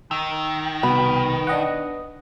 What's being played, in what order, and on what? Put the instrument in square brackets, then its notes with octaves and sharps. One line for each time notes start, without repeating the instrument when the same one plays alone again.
[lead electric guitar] D#3 [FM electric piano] E6
[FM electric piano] C2 B2 [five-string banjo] B3 B4
[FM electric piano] D4 D#5 F#5